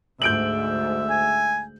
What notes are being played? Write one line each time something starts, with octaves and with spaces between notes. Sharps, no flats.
D2 G#2 E5 G6 D7 F#7
G#5